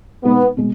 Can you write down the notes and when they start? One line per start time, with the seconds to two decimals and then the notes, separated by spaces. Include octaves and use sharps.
0.24 B2 G#3 B3 D#4
0.57 B2 G#3